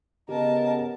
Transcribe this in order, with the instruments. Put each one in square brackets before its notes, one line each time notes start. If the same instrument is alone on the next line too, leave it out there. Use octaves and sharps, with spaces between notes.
[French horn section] C#3 B3 [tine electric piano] G4 [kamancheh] A#4 A5 [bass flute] D#5